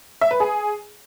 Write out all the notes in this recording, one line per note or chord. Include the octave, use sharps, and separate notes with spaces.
E5
B4
G#4